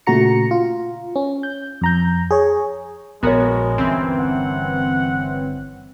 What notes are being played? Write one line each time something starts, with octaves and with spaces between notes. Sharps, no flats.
A#2 C#3 A3 F#4 A#5 C#7
F4
C#4
G6
F2 A#5 G6
G#4 C#5
A#1 G#3 B3 F#4 A#4 C#5
G1 E3 C4 C#4
F#5